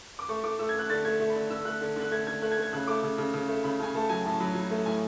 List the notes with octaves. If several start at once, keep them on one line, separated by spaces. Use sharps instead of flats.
D6
A3 C#6
A3 D6
A3 E6
G#6
A3 F#6
D3 A6
A3 G#6
A3
B5
D3
D3 E6
A3 F#6
D3
D3 F#6
A3 G#6
D3 G#6
A3 F#6
G#6
A3
G#6
C#3 F#6
A3 D6
C#3
C#3
C#3
A3
C#3 B5
C#3 G#5
A3 A5
F#3 G#5
A2 A5
F#3 B5
F#3
A3
A2 G#5